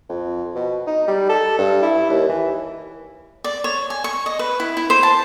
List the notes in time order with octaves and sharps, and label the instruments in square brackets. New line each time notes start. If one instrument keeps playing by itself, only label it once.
[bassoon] F2
B2
D#4
G3
A4
G2
E4
D#2
E3
[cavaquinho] D5
C#5
G#5
C#6
D#5
B4
E4
E4
C5
A5